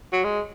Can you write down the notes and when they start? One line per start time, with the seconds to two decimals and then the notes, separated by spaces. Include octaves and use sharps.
0.13 F#3
0.24 G#3